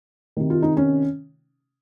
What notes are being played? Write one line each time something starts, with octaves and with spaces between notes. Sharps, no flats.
C3 D#3
F4
D#4
C#4